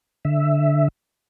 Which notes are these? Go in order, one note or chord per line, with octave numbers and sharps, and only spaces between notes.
D3 E5